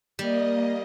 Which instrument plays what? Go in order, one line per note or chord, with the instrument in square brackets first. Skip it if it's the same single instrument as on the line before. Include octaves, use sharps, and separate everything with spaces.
[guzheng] G3 [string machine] A#3 D#5